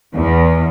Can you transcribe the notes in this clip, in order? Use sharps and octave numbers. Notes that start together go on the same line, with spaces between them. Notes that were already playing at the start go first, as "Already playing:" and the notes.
E2